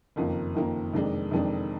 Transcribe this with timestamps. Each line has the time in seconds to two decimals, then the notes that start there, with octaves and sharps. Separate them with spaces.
0.16 F#1 F2 D#3 A#3 F4
0.55 F#1 F2 D#3 A#3 F4
0.93 F1 F2 D#3 G#3 D4
1.31 F1 F2 D#3 G#3 D4